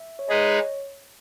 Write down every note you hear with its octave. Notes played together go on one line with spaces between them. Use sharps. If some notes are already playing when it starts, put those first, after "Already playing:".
Already playing: E5
C#5
G#3 D#4 G#4 B4 D#5
C#5